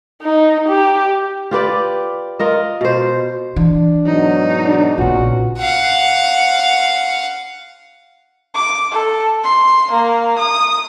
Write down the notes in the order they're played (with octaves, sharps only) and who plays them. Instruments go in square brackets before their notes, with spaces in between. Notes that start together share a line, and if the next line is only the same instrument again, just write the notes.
[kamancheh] D#4
G4
[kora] F4 G4 B4 D5
F4 A#4 D#5
B2 C5
[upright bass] E3 [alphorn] D4
[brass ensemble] G#2 B2 F#3 [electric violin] D#4
[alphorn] D4
[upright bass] A#1 C#3 [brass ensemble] B3 C#4 F4 [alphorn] F#4
[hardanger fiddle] F5 F#5
[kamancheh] D6
A4
C6
A#3
D#6